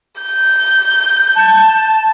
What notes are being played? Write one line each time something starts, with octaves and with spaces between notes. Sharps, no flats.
G6
A5